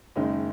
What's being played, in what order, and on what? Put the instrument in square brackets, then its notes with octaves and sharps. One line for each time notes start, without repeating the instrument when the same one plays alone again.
[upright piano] F#1 F#2 D#3 G#3 D#4